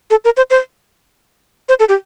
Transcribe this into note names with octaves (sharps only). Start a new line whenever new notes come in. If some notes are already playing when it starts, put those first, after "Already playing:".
A4
A#4
C5
C5
C5
A4
G4